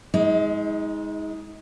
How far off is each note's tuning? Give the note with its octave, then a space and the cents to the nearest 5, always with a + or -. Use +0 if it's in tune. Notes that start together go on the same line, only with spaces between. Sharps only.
G#3 +0 D#4 +35